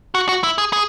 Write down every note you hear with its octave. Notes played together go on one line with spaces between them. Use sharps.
F#4
F#4
E4
G#4
G#4